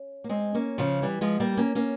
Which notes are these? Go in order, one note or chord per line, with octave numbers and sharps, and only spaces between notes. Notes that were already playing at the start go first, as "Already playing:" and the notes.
Already playing: C#4
A#3
G#3 C4
A#3 C#4
C#3 F3
E3 G3
F3 G#3
G3 A#3
A#3 C#4
A#3 C#4